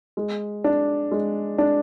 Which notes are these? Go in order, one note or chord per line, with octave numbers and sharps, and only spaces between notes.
G#3
D4
G#3
D4